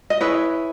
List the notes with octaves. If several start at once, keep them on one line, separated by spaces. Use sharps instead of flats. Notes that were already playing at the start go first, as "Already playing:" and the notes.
D#5
E4 G#4 B4 C#5